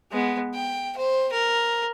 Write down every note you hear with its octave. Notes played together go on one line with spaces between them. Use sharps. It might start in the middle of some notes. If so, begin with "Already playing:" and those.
G#3 B3
G5
C5
A#4